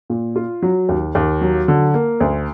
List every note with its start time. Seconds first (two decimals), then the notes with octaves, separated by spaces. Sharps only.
0.10 A#2
0.36 F4
0.62 F#3
0.89 D#2
1.15 D#2
1.42 F#3
1.68 D3
1.94 A#3
2.20 D2